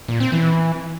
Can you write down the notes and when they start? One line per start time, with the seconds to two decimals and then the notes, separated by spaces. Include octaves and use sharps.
0.08 A#2
0.20 C4
0.32 E3